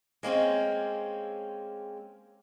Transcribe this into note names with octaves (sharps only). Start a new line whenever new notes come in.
G#3 A#3 C4 C#4